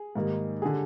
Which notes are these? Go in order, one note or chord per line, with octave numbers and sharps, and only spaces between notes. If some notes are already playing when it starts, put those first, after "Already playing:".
Already playing: G#4
G#2 D#3 G3 A#3
G#4
D3 G4